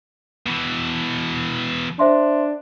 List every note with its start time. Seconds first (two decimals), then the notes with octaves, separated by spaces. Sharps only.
0.47 B2 E3
1.99 D4 C5 E5 C6